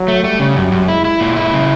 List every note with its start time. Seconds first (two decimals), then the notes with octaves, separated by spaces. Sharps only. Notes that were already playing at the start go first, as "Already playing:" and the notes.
Already playing: F#3
0.08 A3
0.23 G3 A3
0.40 C#3
0.56 F#2
0.72 F#2
0.88 G#3 E4
1.05 E4
1.20 A#2 G#3
1.36 E4
1.53 C#3